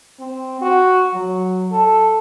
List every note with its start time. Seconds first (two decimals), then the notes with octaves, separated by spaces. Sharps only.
0.20 C4
0.61 F#4
1.14 F#3
1.72 A4